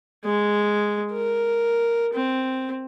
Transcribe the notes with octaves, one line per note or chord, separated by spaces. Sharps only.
G#3
A#4
C4